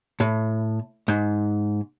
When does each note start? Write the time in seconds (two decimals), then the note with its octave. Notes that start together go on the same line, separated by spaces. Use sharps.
0.20 A2
1.08 G#2